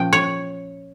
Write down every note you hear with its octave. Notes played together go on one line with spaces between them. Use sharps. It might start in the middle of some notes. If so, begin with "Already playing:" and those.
Already playing: A#2 F3 C#4 G5
C#5